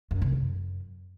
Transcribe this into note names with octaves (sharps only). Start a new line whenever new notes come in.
F#2
C3
F#2